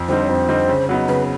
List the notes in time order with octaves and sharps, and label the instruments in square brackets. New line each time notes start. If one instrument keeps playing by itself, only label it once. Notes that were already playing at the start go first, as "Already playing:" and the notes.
Already playing: [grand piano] F2
[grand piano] D3 G3 C4 D#4 [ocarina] C5
[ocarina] C#5
[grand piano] F2 [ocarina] C5
[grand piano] D3 G3 C4 D#4
C#3
F#3 B3 D#4
[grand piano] C#3 [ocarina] B4